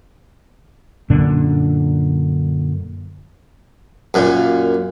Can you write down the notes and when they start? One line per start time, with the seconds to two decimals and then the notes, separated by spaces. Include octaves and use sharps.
1.10 F#2 A#2 D3 D4
4.14 F#2 A#2